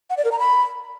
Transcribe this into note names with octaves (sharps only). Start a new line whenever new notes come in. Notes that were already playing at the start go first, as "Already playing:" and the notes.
F#5
D5
A#4
A#5
B5